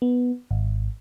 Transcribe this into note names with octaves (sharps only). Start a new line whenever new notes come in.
B3
G#1